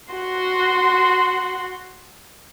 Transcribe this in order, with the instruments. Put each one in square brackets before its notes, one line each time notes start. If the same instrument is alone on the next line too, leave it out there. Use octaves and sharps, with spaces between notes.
[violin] F#4 C6